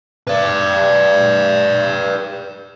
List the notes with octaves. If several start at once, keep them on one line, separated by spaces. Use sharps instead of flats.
B4 D5